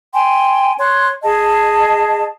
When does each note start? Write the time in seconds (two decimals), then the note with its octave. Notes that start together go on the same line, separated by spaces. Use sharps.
0.13 G5 G#5 C6
0.78 C#5 C6 F#6
1.22 G#4 D#5 A5